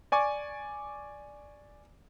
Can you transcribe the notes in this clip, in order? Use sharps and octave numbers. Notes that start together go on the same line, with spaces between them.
D5 G#5 C#6 D6